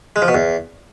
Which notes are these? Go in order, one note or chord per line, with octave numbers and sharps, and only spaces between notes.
G#3
F3
B2
E2